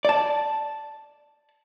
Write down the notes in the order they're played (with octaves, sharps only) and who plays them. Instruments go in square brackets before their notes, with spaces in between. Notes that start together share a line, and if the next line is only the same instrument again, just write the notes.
[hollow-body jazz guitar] D5 A5